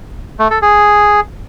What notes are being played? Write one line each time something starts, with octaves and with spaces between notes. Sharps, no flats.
A3
A4
G#4